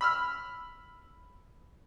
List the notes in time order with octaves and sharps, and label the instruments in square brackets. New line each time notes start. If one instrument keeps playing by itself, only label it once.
[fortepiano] B5 E6 F6